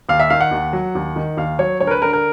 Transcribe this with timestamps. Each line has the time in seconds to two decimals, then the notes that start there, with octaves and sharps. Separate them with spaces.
0.09 D#2 F5
0.20 E5
0.30 D#3 F5
0.41 F#5
0.51 D#2
0.73 F#3
0.95 D#2
1.16 D#3
1.37 D#2 F5
1.59 F#3 C#5
1.80 D2 C#5
1.87 A#4
1.91 B4
2.02 D3 A#4
2.13 A#4